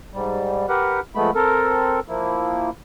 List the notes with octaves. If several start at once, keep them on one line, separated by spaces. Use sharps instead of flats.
G#2 G3
G4 A#4 B4 F#5
F2 G#3 A3 B3 B5
C4 A4 A#4
F3 A#3 E4